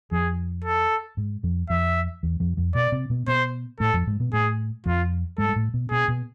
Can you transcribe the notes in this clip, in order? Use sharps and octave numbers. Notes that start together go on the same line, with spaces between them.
F2 F3 G#4
A4
G#2 G#3
F2 F3
F2 F3 E5
E2 E3
F2 F3
F2 F3
B2 B3 D5
C3 C4
B2 B3
B2 B3 C5
A2 A3 A4
F2 F3
G#2 G#3
B2 B3
A2 A3 G#4
F2 F3 F4
G#2 G#3 A4
G#3
A2 A3
B2 B3
B2 B3 G#4
B2 B3